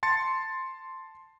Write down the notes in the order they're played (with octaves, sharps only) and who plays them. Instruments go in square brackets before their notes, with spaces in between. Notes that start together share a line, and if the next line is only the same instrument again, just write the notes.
[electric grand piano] A5 C6 A6 C#7